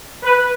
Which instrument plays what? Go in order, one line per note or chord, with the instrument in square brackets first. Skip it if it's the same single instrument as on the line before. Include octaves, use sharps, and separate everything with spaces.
[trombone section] B4